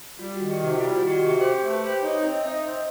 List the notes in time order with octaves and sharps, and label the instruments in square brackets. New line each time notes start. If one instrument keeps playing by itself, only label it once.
[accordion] G3 [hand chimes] F4
[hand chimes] F#4
[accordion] D#3
[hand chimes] G4
[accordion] C3
[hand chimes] F#4
F4
[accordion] G3 [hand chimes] E4
[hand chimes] F#4
F4
[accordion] D#3
[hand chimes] G4
F#4
[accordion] C3 [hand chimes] G4
[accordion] G4 [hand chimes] C5
[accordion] A3
[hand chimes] B4
[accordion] G4 [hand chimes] C5
[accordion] D#4 [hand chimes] C#5
[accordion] C4 [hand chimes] D#5
[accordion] D#4 [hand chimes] E5
[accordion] C4 [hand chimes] D#5